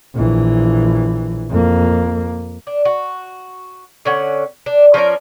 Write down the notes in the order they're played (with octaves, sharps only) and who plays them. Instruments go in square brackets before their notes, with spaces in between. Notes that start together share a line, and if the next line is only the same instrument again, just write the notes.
[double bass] A#1 E3
F2 A#3
[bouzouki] D4
F#4
D3 C#4 F#5
D4
F3 C#4 A#4 D5